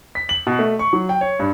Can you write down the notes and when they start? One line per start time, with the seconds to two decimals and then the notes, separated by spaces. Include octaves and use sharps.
0.15 B6
0.29 F#7
0.47 B2
0.59 A3
0.79 C#6
0.93 F#3
1.09 G5
1.21 C#5
1.39 G2